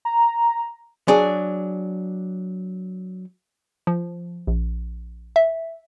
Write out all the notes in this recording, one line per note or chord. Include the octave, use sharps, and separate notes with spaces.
A#5
F#3 D4 G#4
F3
A#1
E5